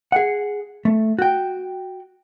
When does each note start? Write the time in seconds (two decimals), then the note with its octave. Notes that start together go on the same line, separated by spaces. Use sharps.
0.12 G#4 F#5
0.85 A3
1.19 F#4 G5